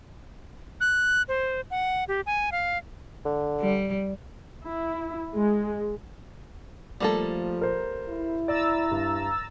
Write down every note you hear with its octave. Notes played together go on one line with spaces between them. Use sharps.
F#6
C5
F#5
G4
G#5
F5
D3
G3
E4
G#3
F3 G3 A3 A#3 A4
A#4 C5
E4
D5 A#5 E6 A6
G2